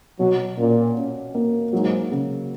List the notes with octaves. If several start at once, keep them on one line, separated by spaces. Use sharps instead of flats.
B2 F#3
A#2 C#4
C#4
A#3
G#2 F#3
C#3